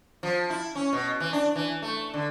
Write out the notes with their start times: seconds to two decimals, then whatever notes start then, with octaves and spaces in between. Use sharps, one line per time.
0.23 F3
0.50 E4
0.75 C#4
0.93 B2
1.20 E3
1.33 D4
1.56 E3
1.82 A3
2.14 D3